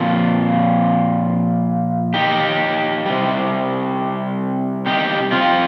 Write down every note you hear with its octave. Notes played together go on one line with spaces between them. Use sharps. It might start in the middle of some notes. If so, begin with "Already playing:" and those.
Already playing: A#2 F3 C4 F4
D#4 G4
C3 G3
D#4 G4
C4 F4